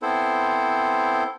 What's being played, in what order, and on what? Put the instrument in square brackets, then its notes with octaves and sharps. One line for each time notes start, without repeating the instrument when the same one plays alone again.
[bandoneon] B3 C4 E4 A4 C5